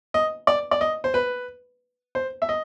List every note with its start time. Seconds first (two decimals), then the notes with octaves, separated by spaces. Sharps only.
0.14 D#5
0.47 D5
0.71 D5
0.81 D#5
1.04 C5
1.14 B4
2.15 C5
2.42 E5
2.49 D#5